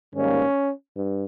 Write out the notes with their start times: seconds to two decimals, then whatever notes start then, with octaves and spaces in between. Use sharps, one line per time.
0.14 G#2 D#3 G3 A#3 C#4
0.96 G2